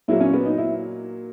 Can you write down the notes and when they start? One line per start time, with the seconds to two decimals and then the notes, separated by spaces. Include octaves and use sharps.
0.08 A#2 F#3 A#3 E4
0.20 C#4
0.33 B3
0.46 D#4
0.58 E4